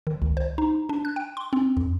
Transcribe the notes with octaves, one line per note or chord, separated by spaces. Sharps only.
D#3
C#2
C5
D#4
D4
F#6
G5
C6
C4
F2